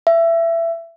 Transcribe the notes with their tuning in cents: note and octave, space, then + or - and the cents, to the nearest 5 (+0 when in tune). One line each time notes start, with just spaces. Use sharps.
E5 +20